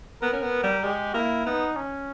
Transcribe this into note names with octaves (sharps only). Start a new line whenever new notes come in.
B3 A#4
C#4
B3
G3
G#3 G4
A#3 E4
B3 D#4
C#4